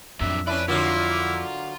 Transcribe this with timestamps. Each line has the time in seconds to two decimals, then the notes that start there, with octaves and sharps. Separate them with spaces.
0.21 F2 F#3 D4 E5
0.47 C#4 E4 B4 D5 A5
0.68 D3 F#3 A#3 E4 F4